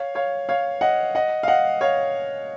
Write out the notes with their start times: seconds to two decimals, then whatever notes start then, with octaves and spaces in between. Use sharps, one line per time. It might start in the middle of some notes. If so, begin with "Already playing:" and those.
Already playing: C#5 F5
0.15 C#5 F5
0.49 C#5 F5
0.81 D#5 F#5
1.15 D#5 F#5
1.43 F5
1.48 D#5 F#5
1.81 C#5 F5